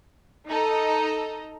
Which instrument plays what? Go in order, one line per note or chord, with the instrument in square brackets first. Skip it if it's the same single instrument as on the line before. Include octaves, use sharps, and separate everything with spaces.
[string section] D#4 A4 D#5 A#5